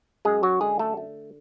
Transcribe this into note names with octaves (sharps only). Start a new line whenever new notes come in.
F#2 G#3 G#4
F#3 F#4
D3 G#3 G#4
A3 A4
A3